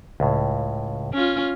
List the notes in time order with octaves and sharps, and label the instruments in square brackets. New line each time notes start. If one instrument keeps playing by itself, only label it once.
[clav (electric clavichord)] C#2 A2
[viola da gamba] C#4 F4